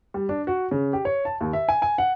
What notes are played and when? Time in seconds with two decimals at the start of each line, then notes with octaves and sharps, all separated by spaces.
0.14 G3
0.29 D4
0.47 F#4
0.71 C#3
0.93 G4
1.05 C#5
1.25 A5
1.41 D#2
1.53 E5
1.69 G#5
1.82 G#5
1.98 F#5